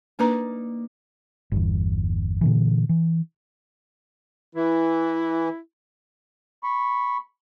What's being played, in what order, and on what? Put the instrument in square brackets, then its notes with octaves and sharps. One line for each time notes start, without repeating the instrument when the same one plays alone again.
[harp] A#3 D#4 D5 [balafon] D4 B4 A#5
[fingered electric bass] G1 E2
A#2 D3 E3
E3
[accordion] E3 [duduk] E4
[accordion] B5 C#6